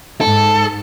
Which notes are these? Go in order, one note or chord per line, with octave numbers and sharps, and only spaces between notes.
G#2 A4